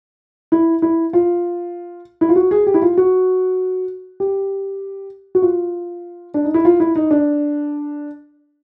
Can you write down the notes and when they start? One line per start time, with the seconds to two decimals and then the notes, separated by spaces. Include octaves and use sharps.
0.52 E4
0.82 E4
1.13 F4
2.21 E4
2.29 F4
2.36 F#4
2.51 G#4
2.67 G4
2.74 E4
2.82 F4
2.98 F#4
4.20 G4
5.35 F#4
5.42 F4
6.34 D4
6.44 D#4
6.54 E4
6.65 F4
6.80 E4
6.96 D#4
7.11 D4